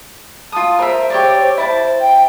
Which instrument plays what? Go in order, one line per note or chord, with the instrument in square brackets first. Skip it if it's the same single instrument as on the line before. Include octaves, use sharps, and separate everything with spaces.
[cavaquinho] F4 D#6 [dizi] A5
[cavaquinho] A#4 E5 [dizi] C5
[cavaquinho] G4 C#5 D5
[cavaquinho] E4 A5 [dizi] C5
[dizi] G5